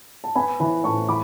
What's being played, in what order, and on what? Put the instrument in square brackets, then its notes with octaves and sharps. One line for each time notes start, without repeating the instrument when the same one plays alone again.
[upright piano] A5
[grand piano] B3 [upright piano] G#5 B5
[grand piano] E3 [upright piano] G#5 B5
[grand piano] A2 [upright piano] A5 C#6
[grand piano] E3 [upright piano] B5 D6